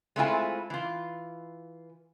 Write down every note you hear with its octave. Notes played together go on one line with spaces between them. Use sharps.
G#3 A3 C4 E4 F4 G#5
E3 F4